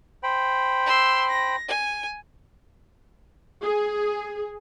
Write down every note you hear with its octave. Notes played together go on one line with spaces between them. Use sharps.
C5 G5 B5
C6 E6
A#6
G#5
G#4